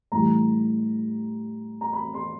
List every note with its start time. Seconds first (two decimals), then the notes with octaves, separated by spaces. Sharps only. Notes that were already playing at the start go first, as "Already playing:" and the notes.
0.12 A2 E3 G3 A#5
1.81 A#5
1.93 B5
2.14 C6